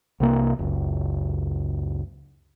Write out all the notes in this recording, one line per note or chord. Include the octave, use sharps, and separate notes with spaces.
C2 C3 A#3
F#1 C#2